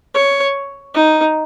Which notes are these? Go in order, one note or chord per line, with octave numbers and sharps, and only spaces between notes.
C#5
D#4